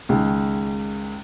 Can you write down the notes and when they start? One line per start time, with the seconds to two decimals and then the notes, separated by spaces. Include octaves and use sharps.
0.09 C#2 D#3 G#3